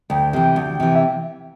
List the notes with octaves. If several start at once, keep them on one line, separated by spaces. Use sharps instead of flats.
D2 G5
C3 E3 G5
D2
C3 E3
E5